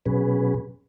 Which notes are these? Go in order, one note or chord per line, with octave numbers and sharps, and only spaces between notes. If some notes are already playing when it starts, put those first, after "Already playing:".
B2 F#3 C#4 G#4 B4